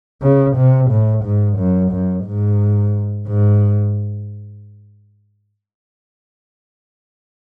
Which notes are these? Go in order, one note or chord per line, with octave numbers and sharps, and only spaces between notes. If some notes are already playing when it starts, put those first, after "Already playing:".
C#3
C3
A2
G#2
F#2
F#2
G#2
G#2